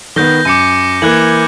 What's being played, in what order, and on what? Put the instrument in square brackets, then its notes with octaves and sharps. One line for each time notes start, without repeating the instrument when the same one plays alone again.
[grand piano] D#3 B3 [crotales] G6 A#6 G7
[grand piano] F#2 [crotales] D6 C#7 D#7
[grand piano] E3 A#3 [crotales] F#6 G#6 F#7